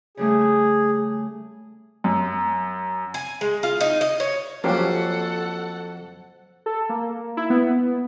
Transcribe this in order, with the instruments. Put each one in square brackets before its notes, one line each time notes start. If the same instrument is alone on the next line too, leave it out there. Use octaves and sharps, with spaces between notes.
[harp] C#3 G3 A3 [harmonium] G#4
[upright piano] F#2
[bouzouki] G#5
G#3
F4
D#4
D#5
C#5
[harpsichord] F2 F#3 [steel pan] A#3 C#4 G4 [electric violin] A4 F#5 [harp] C5
[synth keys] A4
A#3
E4
B3